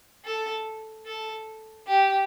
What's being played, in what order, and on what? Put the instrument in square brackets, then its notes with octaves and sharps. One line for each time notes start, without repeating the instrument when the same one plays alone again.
[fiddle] A4
A4
G4